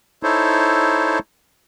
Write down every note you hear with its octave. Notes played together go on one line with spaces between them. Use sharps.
D#4 E4 A4 C5 C#5